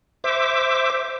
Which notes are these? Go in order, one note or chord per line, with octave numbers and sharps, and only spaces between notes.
C5 E5 D6